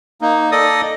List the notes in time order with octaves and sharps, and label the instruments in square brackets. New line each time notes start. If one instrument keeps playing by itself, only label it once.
[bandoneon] A#3 D#4
A4 D5 D#5 D#6